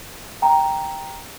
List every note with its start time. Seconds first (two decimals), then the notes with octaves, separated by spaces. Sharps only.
0.42 G5 A#5